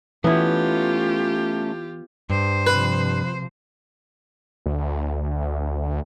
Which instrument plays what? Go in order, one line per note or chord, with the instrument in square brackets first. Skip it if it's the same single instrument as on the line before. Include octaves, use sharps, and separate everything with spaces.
[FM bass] E3 [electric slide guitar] A3 C#4 [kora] B3 E4 [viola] F4 G4
[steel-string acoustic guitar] G2 [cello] C5
[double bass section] C3 F3 [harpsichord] B4
[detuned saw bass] D2